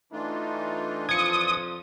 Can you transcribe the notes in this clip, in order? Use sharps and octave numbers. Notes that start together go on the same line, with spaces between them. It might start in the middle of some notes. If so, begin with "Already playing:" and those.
E3 A3 D4 D#4 F4
F2 F3 D#6 G#6 C#7